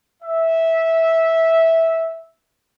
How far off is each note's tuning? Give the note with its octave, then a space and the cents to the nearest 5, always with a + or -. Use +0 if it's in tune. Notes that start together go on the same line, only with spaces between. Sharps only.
E5 -10